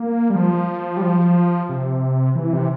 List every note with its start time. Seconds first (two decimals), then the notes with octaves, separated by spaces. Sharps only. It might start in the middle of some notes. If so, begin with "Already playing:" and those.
Already playing: A#3
0.30 G3
0.36 F3
0.97 G3
1.02 F3
1.69 C3
2.35 E3
2.53 C3